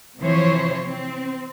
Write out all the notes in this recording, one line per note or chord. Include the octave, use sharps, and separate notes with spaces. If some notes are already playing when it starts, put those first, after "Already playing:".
C3 E3 F3 C5 C#5
C4